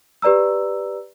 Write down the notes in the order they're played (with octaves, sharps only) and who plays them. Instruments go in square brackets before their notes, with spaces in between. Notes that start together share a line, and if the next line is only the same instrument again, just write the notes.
[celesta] G4 B4 D5 A#5 E6